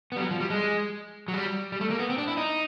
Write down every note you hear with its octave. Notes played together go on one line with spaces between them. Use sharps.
B3
G3
F#3
F3
G3
G#3
F#3
G3
G3
A3
A#3
B3
C4
D4
E4
D#4